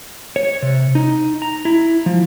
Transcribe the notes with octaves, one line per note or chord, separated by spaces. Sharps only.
C#5
C3
D#4
A#5
E4
F3